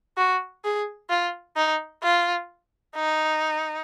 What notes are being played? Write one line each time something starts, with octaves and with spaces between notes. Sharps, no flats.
F#4
G#4
F4
D#4
F4
D#4